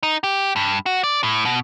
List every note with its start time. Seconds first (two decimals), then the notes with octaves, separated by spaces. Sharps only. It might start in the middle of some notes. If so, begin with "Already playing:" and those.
0.03 D#4
0.24 G4
0.56 G2
0.86 F#4
1.04 D5
1.23 A2
1.45 B2